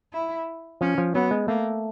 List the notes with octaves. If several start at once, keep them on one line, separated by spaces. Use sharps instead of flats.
E4
F3 C#4
F3
F#3 B3
G#3
A3 A#3